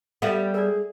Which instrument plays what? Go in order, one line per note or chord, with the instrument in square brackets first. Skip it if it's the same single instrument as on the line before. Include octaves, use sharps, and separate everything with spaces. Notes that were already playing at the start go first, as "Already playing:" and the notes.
[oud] G3 B3 [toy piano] A4 E5 F5
[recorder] G#4 [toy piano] A#4 D5